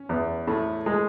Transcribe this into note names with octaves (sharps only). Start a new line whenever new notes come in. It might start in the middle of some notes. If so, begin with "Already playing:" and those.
Already playing: C#4
E2
A2 A3
G#3